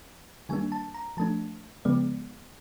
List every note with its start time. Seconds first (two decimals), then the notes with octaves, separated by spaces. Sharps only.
0.49 D#3 G3 A#3 D4 G#5
0.72 A5
0.94 A#5
1.17 F3 A3 D4 A5
1.85 C#3 F3 G#3 B3 D5